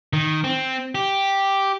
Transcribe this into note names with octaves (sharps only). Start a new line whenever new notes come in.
D#3
C4
G4